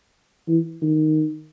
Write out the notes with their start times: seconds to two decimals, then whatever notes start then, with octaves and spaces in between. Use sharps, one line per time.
0.48 E3
0.82 D#3